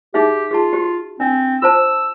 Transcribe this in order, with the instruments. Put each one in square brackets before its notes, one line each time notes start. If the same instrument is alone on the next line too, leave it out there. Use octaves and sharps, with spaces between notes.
[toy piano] D#4 G#4 E5 [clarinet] G4
[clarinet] F4 [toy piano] G#4 A5
[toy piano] F#4 G4
[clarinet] C4 [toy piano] D4
[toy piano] F4 C5 A5 [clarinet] E6